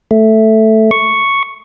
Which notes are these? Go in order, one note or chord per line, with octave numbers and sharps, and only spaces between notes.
A3
C#6